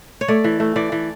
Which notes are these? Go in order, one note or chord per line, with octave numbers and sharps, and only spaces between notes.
C#5
A3 D5
E3
A3
E3 D5
E3